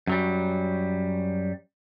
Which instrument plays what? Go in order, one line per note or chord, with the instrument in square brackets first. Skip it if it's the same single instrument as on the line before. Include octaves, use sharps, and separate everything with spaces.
[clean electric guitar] F#2 F#3 G3